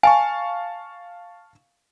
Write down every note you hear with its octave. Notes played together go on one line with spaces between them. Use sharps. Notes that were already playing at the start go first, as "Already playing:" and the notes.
F5 G#5 A5 C#6